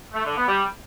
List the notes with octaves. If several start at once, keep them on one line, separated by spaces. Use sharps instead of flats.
A3
D3
B3
G3